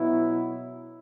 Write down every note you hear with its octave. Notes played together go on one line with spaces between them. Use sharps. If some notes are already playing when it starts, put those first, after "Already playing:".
Already playing: B2 F#3 B3 E4